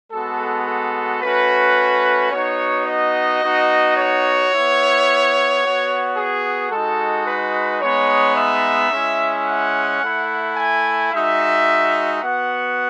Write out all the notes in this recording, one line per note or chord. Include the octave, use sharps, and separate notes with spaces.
G#3 B3 F#4 A4
A4
A3 C#4 F#4 B4
B3 D#4 F#4 C#5
D#5
B3 D#4 F#4
C#5
B3 E4
B3 F#4
G#4
G#3 D#4 F#4 A4
B4
G#3 B3 D#4 C#5
E5
G#3 C#4 E4
F#5
A3 E4
G#5
G#3 D#4 F#4 E5
B3 F#4 F#5